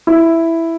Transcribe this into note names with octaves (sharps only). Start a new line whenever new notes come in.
E4